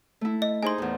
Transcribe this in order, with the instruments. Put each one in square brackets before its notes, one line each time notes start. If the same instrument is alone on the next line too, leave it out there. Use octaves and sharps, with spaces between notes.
[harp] A3 E4
[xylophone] D#5
[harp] D#4 G#4 C5 [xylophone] G#5 C6
[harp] E2 A2